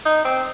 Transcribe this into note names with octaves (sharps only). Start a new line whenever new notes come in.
D#4
C4